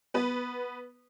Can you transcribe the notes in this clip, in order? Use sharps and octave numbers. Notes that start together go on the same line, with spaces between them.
B3 B4